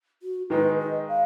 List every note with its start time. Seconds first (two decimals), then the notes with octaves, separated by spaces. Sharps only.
0.22 F#4
0.50 D#3 G#3 D#4 B4
0.80 D#5
1.08 F5